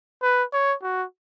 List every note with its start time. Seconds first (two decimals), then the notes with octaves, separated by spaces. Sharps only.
0.23 B4
0.53 C#5
0.83 F#4